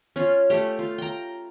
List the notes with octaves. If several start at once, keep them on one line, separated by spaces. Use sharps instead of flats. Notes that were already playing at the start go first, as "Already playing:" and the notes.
C#4 F4
A3 G4
F4
G5 A#5